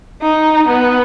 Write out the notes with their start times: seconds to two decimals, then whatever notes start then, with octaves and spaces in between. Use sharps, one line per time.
0.21 D#4
0.67 B3